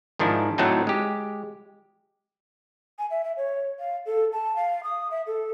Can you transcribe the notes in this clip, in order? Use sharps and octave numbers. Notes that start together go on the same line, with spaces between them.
G#2 D#3 F3 D4 E4
A2 D3 F#3 A3 C4 D#4
G#3 G4
G#5
E5
E5
C#5
F5
A4
A5
F5
D#6
E5
A4